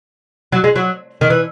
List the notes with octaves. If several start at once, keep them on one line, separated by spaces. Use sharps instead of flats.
F#3
G#3
F#3
D#3
E3